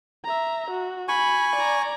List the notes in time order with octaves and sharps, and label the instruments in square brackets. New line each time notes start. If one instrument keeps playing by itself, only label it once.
[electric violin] E5 A#5
F#4
[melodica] G#5 C#6 [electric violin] B5
[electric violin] D5 A#5